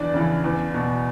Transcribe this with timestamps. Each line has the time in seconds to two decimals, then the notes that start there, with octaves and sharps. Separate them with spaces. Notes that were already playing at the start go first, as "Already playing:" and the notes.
Already playing: E2 D4 D5
0.14 C#3 E3
0.44 E2
0.74 B2